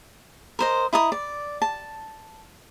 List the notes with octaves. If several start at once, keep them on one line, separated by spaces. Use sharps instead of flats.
A#4 C5 D#5
E4 D#5 A#5 D#6
D5
A5